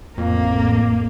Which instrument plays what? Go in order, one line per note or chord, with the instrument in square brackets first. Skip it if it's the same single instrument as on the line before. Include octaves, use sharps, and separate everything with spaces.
[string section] A1 [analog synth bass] F2 [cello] A#3